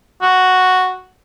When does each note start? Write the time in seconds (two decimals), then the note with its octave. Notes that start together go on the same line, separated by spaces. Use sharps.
0.22 F#4